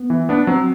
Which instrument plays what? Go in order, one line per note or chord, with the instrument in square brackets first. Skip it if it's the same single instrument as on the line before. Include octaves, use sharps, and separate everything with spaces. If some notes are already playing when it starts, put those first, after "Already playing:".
Already playing: [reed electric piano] B3
[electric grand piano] E3
B3 D4
[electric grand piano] F#3 [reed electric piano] C4